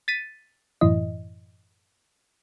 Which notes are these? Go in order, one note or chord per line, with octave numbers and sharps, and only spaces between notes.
A6 B6 D#7
F#2 A2 E3 E4 D#5